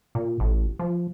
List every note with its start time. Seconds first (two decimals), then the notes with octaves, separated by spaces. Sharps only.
0.15 A#2
0.40 A1
0.79 F3